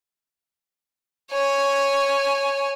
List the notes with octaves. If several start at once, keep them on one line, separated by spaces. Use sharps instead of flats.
C#5 G#5